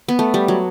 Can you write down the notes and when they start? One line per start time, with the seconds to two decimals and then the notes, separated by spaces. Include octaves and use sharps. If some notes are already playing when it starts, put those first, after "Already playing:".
0.08 B3
0.19 A3
0.34 G3
0.48 F#3